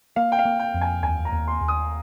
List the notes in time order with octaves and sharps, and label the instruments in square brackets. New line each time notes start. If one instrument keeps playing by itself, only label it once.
[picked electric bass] A#3 [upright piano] F5
[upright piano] G5
F5
[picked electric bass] A#3
[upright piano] G5
[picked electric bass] F2
[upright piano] G#5
[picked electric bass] D#2 [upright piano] G#5
[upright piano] A#5
[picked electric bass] D#2
[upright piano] C6
[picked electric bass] D#2
[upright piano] D#6